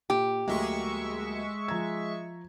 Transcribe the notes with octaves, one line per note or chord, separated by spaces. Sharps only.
A#2 G4
D2 F#3 G#3 A#3 E5 C#6
F3 A#5 G#6